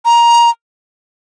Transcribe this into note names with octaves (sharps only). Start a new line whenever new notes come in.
A#5